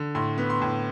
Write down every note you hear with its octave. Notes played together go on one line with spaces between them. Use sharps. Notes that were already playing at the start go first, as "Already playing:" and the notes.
Already playing: D3
A2 C6
B3
C6
A2